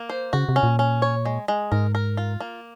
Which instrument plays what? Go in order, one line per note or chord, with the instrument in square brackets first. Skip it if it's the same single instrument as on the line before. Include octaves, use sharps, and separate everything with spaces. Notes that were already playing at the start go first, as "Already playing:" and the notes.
Already playing: [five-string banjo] A#3
C5
[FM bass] C#3 [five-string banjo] F#4
[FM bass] C3
[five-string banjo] C#4
[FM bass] A#2
[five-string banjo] C#4
C#5
G#3
G#3
[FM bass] G#2 [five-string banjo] A#4
[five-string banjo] A#4
F4
A#3